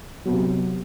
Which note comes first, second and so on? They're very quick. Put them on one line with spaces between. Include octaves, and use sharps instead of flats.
F#3 B3 C3